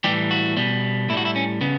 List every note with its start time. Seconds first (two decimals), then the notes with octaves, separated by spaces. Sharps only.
0.04 A2 E3 G3 G4
0.31 F#4
0.57 B2 G3
1.09 A2 E4
1.13 G3 F#4
1.25 E4
1.36 C#4
1.61 C#3 B3